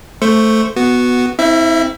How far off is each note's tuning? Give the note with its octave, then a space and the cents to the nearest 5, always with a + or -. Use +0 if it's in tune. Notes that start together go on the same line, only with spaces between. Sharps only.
A3 +0 C5 +0 C#6 +0
B3 +0 F#4 -5
C4 +0 E4 -25 E5 +30